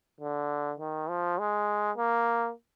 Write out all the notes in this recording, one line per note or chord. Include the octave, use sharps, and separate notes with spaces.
D3
D#3
F3
G#3
A#3